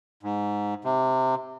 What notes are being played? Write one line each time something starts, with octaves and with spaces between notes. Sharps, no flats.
G#2
C3